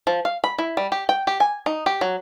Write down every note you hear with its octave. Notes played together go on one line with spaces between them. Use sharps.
F3
F5
B5
E4
G3
G4
G5
G4
G#5
D#4
G4
F#3